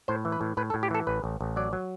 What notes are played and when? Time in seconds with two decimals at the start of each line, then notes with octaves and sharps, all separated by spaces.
0.08 A2 C5
0.25 E3
0.32 B4
0.41 A2
0.57 A2 B4
0.70 A4
0.74 A2
0.83 G4
0.91 E3 A4
1.07 A1 B4
1.24 A1
1.41 A1
1.56 F#3 D5
1.73 F#3